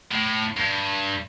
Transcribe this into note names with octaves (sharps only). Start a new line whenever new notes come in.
A2
G2